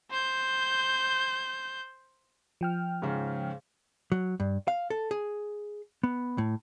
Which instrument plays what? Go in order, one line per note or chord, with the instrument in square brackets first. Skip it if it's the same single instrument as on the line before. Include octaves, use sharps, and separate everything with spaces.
[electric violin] C5 G6
[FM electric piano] F3 G5 F6
[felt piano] G#2 C#3
[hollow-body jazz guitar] F#3
G2
F5
A4
G#4
B3
A2